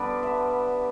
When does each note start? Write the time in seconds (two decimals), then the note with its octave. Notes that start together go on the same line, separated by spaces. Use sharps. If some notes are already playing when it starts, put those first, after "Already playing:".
Already playing: D3 G3 B3 D4 B4 D5
0.23 E5